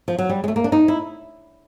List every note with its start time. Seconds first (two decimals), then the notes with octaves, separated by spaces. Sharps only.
0.08 F3
0.19 F#3
0.29 G3
0.44 G#3
0.48 A3
0.56 A#3
0.64 D4
0.72 D#4
0.88 E4